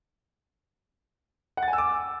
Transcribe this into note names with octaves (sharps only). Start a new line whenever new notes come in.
F#5
A6
G#5
E6
D6